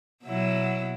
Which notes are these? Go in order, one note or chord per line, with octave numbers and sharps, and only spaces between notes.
B2 F#3 E4